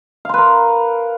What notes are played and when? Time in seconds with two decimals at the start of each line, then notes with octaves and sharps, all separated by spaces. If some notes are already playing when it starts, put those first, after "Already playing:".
0.25 F5
0.29 C6
0.34 B4
0.38 A#4